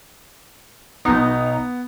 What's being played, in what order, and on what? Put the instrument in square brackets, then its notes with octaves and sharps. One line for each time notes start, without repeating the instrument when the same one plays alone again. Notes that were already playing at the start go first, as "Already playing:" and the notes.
[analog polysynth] B1 D#4 [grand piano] B3